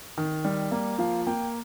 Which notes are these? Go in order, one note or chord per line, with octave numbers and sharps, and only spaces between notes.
D#3
G3
A#3
F3 F5
A#3 G5